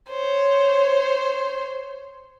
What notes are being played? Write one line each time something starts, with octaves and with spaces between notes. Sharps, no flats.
C5 C#5